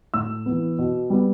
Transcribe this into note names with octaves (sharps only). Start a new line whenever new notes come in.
A2 E6
E3 B3
B2
G3 B3